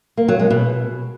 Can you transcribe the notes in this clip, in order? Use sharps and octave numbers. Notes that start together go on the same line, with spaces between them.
A#3
F#3
G#3
B2